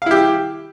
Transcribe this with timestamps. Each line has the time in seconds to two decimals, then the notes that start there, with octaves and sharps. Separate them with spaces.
0.02 F5
0.06 E4
0.11 G4